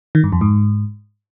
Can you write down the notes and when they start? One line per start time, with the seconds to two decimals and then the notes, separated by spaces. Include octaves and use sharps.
0.15 D#3
0.24 G2
0.32 F2
0.41 G#2